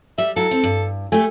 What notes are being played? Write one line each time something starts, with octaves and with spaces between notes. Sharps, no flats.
G3 E5
F#3 E4 A4
C4
G2
A3 G4 G#5